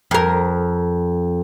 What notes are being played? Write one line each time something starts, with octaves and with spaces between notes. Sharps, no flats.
F2 A#4